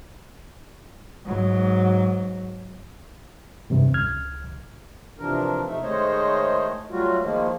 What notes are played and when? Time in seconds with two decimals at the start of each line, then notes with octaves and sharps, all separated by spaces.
1.25 G#2 F#3
3.70 E2 G2 C3
3.94 C#2 F6 G#6
5.19 C3 E3 F3 D4 A#4
5.66 C3 A3 D#4 E5
5.83 D#3 G#3 A3 C5 C#5 D#5
6.91 F#3 G3 A3 F4 F#4
7.21 D#3 F3 G#3 A#3